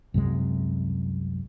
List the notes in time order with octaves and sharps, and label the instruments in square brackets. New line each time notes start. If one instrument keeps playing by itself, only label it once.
[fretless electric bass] C2 F#2 C3 G#3